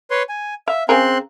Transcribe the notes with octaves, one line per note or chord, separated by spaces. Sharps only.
B4 C#5 C6
G#5
E5 F5
C#3 C4 G#4 A#4 C6 F#6